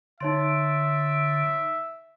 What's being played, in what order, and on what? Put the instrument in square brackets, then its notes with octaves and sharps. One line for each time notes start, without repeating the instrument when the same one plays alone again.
[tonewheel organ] D3 [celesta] D#4 C#5 C6 [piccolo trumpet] E5